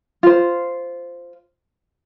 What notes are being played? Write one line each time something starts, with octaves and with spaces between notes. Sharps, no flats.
F4 C5